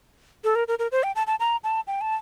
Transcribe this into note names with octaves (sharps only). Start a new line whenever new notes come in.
A4
A#4
A#4
A#4
C5
G5
A5
A5
A#5
A5
G5
A5